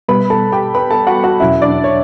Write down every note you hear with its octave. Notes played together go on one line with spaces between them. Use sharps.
B2 G3 B3 B4 B5
A4 A5
G4 G5
B4 B5
A4 A5
F#4 F#5
F#4 F#5
E2 B2 F#3 C#4 E4 E5
D4 D5
C#5